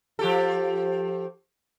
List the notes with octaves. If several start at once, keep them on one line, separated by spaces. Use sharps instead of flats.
F3 G4 A4